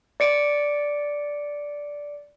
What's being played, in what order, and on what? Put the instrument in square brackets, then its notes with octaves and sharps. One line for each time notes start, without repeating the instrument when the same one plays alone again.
[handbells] D5 C#7 D7